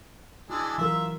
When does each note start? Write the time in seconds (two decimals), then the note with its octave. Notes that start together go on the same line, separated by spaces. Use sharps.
0.50 E3 G#3 D4 F#4
0.78 E3 F#3 F4 A#4 E5